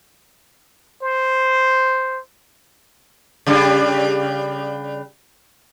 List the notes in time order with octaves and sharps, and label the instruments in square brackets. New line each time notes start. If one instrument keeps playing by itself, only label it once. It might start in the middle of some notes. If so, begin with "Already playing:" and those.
[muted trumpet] C5
[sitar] C#3 G3 D4